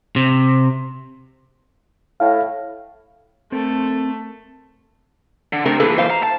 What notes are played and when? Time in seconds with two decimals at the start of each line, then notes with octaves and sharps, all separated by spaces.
0.16 C3
2.20 A2 F5
3.52 A3 C4 A4 A#4
5.53 D3
5.66 C3 A3 D4 A#4
5.80 A#2 E3 G#4 A4 B4
5.98 C5 F5
6.10 A#5
6.23 A5